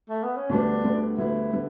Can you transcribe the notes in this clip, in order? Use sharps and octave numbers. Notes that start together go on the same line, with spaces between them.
A3
B3
C#4
D2 D3 G3 B3 D4
D2 D3 G3 B3
D2 D3 G3 B3 E4
D3 G3 B3